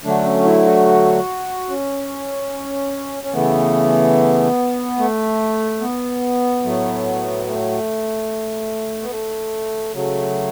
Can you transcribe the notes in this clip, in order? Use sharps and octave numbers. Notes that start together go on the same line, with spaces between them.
D3 F#3 A3 D4
C#4
E4
F#4
C#4
C#4
C#3 E3 A3 B3
A3
B3
A2 F#3 A3
A3
B3
A3
C#3 F#3 A3